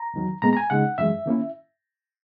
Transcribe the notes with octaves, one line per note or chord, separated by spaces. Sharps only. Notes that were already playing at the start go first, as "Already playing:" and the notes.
Already playing: A#5
E2 D#3 F#3
A#2 G#3 B3 A#5
A#5
G#5
C#3 G#3 D#4 F#5
F#2 E3 G#3 E5
D#3 A#3 C#4 E4